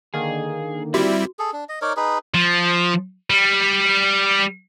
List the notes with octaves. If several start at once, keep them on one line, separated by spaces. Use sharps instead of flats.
D3 D#3 A#3 G#4
G3 C4 E4 F#4
G#4 A4
D4
D#5
D#4 A#4 C#5 D5
D#4 G#4 B4
F3
G3